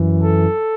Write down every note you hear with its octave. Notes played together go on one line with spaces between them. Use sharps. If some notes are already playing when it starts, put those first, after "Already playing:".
Already playing: F#2 E3
A4